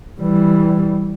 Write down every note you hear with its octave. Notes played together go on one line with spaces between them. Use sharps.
E3 G3